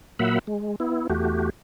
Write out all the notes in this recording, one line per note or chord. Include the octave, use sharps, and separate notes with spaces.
A#2 F#3 A#3 E5 F#5 B5
G#3
B3 E4
E2 A3 F#4 G4